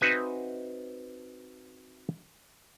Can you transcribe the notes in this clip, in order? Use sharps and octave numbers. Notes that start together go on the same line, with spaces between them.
C4 D#4 F#4 B4 E5 G#5